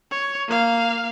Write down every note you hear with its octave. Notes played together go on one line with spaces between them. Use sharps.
C#5
A#3 F5